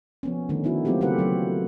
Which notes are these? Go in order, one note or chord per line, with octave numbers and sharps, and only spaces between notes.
F3 B3 C#4
D3 D#3 A3 C#4 D#4
B3 D#4 E4 F#4
F#3 A3 A#3 C4 F4 G4
C#3 F4 G4 A4 B4 F#5
F#3 C#5